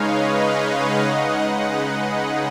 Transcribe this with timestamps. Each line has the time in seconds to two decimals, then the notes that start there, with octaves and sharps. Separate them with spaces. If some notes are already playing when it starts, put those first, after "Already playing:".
Already playing: C#3 G#3 D#4 B4 C#5 D#5 F5
0.19 C#5 F5
0.62 D#5 F#5
1.04 C#3 G#3 D#4
1.46 B4 D#5
1.88 G#4 B4